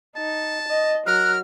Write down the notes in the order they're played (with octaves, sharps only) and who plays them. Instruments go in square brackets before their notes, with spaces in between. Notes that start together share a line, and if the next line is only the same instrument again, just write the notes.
[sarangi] D#4 [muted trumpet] A5
[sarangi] D#5
[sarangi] F#3 [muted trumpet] A#4 [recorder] F6 [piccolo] F#6